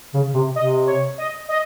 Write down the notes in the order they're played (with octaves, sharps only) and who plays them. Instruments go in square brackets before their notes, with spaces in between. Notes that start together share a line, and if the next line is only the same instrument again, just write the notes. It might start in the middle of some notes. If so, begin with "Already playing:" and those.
[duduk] C#3
C3
[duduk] C3 [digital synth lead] D#5
[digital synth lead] C#5
D#5
D#5